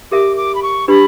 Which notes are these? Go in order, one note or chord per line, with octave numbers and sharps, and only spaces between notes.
G4 A#4 E5 D6
D6
B5
C#6
D4 G4 B4 B5